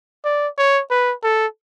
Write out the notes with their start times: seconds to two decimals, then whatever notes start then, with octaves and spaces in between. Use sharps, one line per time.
0.25 D5
0.58 C#5
0.90 B4
1.23 A4